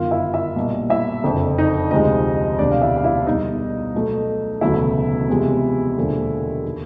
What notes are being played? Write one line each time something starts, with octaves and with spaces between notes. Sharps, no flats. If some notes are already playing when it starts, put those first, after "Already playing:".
Already playing: G1 F#2 D#3 F4 F5
E4 E5
E4 E5
B1 A#2 G3
E4 E5
F#1 F2 D3
D#4 D#5
D2 C3 F3 G#3 D#4 D#5
E1 D2 C3 D4 D5
F5
E4 E5
F5
E4 E5
E2 B2 G3 D#4 D#5
B1 B2 F#3 A3
E1 D2 C#3 F#3 A3 E4 E5
E2 C3 F3 G#3
E1 D#2 D3 F3 G#3
D#3